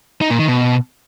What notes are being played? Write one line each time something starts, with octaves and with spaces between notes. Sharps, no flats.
D#4
A#2
D#3
B2